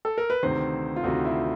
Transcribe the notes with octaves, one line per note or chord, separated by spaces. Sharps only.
A4
A#4
B4
D2 C3 D#3 C5
F4
D2 C3 D#3 F#4
E4